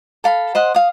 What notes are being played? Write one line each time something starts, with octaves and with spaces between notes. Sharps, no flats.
A4 F5 B5
C5 D#5 F#5 C6
F5 D#6